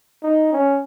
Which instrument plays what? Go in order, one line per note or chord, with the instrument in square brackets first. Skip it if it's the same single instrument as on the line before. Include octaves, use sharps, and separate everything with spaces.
[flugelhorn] D#4
C#4